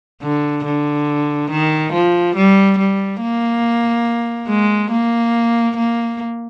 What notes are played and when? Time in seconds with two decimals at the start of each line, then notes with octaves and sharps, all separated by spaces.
0.22 D3
0.65 D3
1.51 D#3
1.93 F3
2.36 G3
2.78 G3
3.21 A#3
4.49 G#3
4.91 A#3
5.77 A#3